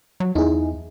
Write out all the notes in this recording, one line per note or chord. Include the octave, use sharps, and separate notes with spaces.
F#3
E2 D#4 E4 G#4